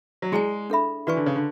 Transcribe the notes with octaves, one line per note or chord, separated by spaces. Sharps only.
F#3
G#3 E4 G#4 D5 G#5
D4 A4 E5 B5
E3 F#4 B4 D5 G#5 C#6
D3
C#3
D3